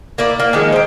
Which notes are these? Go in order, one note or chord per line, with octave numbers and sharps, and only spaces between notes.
A#3 E4 D5
A#3
D#3 F3 G#3
C5 G5